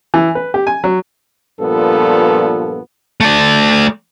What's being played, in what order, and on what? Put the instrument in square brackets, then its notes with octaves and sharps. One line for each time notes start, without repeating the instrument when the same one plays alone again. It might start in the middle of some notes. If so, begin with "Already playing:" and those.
[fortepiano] E3
B4
G4
G#5
F#3
[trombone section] G2 A#2 F3 B3 A4
[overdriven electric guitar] A3 D5